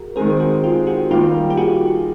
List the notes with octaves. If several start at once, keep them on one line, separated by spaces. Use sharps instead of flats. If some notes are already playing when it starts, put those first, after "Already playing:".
Already playing: F#4 G#4 A#4
D#3 G#3 C4 G#4 A#4
F#4 G#4
F4 G4
F#4 G#4
D#3 G3 A#3 F4 G4
G4
F#4 G#4